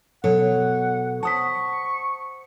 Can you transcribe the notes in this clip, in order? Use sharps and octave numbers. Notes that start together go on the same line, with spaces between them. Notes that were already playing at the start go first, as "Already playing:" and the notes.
B2 F#3 A4 C#5 F#5
C5 F#5 A5 C#6 D#6 B6